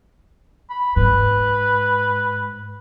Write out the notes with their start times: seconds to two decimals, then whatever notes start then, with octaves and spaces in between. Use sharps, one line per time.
0.70 B5
0.96 G#2 B4